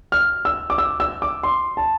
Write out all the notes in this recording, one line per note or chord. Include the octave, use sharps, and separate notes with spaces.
F6
E6
D6
E6
E6
D6
C6
A5